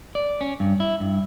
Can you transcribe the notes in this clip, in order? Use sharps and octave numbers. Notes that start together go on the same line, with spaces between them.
D5
C#4
G2
E4
G2